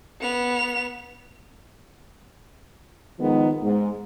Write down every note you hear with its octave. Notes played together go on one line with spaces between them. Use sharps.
B3 F7
D#3 F3 G#3 B3 D#4
G#2